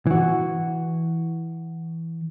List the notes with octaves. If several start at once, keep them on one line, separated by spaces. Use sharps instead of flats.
E3 F#4